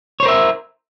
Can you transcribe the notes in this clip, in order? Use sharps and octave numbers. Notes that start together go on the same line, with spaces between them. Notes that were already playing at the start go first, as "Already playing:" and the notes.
A#4 C5 C#5 E5